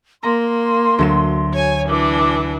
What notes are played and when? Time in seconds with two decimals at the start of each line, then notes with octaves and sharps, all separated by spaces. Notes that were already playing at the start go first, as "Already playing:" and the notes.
0.23 A#3 A#5 C6
0.99 D2 F#3 E7
1.53 C#5 G#5
1.89 E3 D4 D6